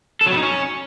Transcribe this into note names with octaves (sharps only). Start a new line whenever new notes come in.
A4
F#3
B3
D#4
C#4